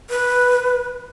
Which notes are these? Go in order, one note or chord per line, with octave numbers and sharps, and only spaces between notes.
B4